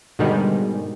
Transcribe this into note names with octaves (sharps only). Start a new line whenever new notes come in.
G#2 B2 D3 D#3 G3 G#3